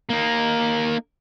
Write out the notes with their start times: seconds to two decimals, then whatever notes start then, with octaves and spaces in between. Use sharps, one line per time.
0.10 A#3 D#4